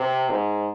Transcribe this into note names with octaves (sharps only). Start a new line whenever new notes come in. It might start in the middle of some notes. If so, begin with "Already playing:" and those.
Already playing: C3
G#2